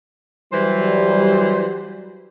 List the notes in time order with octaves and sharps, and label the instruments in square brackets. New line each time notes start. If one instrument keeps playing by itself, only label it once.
[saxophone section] E3 C5 [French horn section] F#3 G3